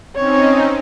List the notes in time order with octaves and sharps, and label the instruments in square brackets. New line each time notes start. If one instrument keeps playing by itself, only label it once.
[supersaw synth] C4 C#4 D#4 [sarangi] C#5